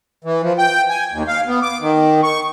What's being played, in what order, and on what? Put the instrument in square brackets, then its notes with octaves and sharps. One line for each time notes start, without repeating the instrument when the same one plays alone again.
[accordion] E3
F3
G5
G#5
D#2
F5
B3
D6
D#3
C#6